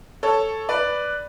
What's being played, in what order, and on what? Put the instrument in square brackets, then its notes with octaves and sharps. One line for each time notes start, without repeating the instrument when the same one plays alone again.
[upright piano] A4 C#5
B4 D5